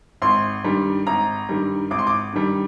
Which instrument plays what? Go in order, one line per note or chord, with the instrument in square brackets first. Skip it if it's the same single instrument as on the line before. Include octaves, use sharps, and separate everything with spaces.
[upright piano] G#1 C6
G2 D#3 G3
G#1 A#5
G2 D#3 G3
G#1 D6
C6
D6
G2 D#3 G3